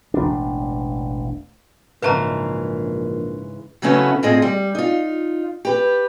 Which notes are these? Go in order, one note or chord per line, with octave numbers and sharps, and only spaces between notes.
E1 A1 D4
A#1 G#2 C#3 E3 B4 A5 A#5
C#3 F#3 A3 B3 C#4 E4
A2 C4 F4 G#4 D#5
G3
D#4 F4
G4 B4